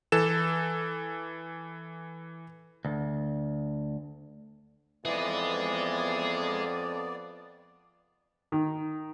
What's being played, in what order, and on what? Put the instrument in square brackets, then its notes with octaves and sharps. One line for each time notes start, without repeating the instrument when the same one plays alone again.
[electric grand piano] E3 A4 E7
[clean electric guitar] D2
[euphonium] F2 [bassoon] E3 [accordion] B3 D5 [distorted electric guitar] G#4 D#5
[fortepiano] D#3